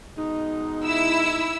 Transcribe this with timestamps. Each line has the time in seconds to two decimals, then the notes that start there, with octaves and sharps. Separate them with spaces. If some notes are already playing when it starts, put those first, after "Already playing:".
0.17 B2 G#3 D#4
0.84 E4 E6